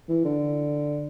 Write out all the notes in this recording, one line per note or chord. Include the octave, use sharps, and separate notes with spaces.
E3
D3